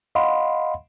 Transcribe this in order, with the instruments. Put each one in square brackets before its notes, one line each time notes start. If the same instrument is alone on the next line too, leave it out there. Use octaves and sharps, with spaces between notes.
[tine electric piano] D#5 F5 F#5 B5 C6